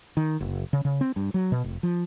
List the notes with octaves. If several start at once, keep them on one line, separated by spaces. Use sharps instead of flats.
D#3
F#1
C#3
C#3
C4
G2
F#3
B2
F1
F3